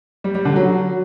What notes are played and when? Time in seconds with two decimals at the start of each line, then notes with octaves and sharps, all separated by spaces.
0.24 G3
0.35 G3
0.45 D3
0.56 F#3